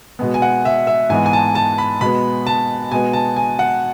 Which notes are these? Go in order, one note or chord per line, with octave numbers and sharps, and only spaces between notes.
B2 G#3 B3
G#5
F#5
E5
E5
G#2 E3 G#3 B3 G#5
G#5
A5
A5
B5
B2 G#3 B3 B5
A5
B2 G#3 B3 G#5
A5
G#5
F#5